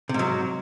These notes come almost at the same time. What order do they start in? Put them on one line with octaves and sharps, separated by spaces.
C3 G#2 F#3